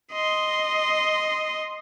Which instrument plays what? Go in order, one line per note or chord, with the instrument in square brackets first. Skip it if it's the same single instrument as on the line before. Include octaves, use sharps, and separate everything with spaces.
[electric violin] D#5 C6